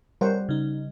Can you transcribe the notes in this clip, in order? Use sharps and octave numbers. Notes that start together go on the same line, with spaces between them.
G3 A#4 C5 C#5 F#5
C#3 D#4